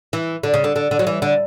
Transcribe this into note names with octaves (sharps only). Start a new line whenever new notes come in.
E3
D3
C#3
D3
D3
D3
F#3
E3
D3